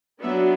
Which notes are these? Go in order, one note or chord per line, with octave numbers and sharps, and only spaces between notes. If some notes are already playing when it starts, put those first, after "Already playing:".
F#3 B3 D4 E5